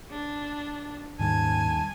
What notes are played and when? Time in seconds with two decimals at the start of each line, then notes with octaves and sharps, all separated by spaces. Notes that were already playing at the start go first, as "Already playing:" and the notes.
0.11 D4
1.20 D#2 G#2 D#3 G3 G#5 A5